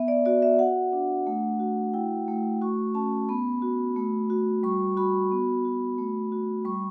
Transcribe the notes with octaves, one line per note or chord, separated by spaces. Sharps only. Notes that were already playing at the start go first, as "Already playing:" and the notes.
Already playing: B3 E5
D5
F#4 D5
E5
F#4 F#5
D4
A3
F#4
E4 G5
A3
F#4 C#6
C#4 A5
B3 B5
F#4
A3
F#4
G3 C#6
F#4 B5
B3
F#4
A3
F#4
G3 C#6